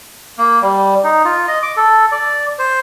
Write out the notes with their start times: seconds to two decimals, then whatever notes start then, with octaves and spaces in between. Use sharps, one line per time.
0.38 A#3
0.62 G3
1.04 D#4
1.25 F4
1.48 D#5
1.63 D6
1.77 A4
2.12 D5
2.59 C5